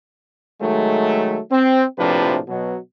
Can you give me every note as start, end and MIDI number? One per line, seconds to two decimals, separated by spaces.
0.61 1.39 51
0.61 1.39 54
0.61 1.39 56
0.61 1.39 57
1.52 1.85 60
1.98 2.39 34
1.98 2.39 45
1.98 2.39 48
1.98 2.39 53
1.98 2.39 62
1.98 2.39 71
2.48 2.76 47
2.48 2.76 54